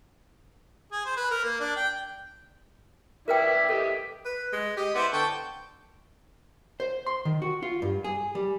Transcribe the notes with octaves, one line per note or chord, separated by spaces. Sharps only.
G#4
C5
B4
A#4
A#3
D4
G5
E4 A#4 B4 D5 E5 G5
G4 A4 D#5 E5
B4
G#3
G4 D#5
B3 E4 C5 D5
D3 G5 A5 C#6
C5
C6
D#3
F#4
F4
G2
G#4
G3